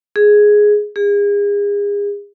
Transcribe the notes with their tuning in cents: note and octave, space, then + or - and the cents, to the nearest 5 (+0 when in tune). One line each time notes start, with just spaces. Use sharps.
G#4 +5
G#4 -35